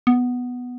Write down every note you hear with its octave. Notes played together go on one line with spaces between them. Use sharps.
B3